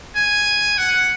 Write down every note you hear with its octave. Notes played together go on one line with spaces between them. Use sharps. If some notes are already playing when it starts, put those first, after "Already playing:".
G#5
F#5